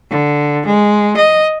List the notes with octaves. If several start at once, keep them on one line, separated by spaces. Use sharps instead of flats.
D3
G#3
D#5